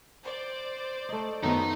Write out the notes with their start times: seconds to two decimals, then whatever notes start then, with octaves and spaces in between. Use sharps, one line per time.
0.24 C5 D5
1.09 A3 D#4
1.43 F#2 D#3 A3 B3 D#4 F5 A#5